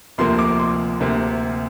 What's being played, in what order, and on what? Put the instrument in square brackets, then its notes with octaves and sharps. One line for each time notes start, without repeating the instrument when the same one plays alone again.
[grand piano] D2 C3 F3 A#3 C6
D6
C6
D2 C3 A#3